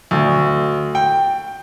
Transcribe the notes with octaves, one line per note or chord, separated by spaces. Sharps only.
D2
G5